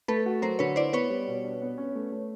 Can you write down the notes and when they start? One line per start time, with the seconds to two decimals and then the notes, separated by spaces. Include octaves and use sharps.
0.08 A3 A4 B4
0.26 F#4
0.42 F#3 A#4 C5
0.59 D3 B4 C#5
0.76 E4 C5 D5
0.93 B3 B4 C#5
1.10 G3
1.28 B2
1.44 D4
1.62 B3
1.78 C#4
1.95 A3
2.12 A3